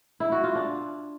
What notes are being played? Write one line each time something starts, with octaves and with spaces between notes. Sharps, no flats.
E4
F#4
F4
D4